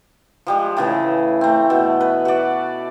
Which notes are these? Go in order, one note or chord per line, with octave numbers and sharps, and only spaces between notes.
F3 G3 G#3
A2 C#3 E3
A3 C4
B2
B4
F#4 D5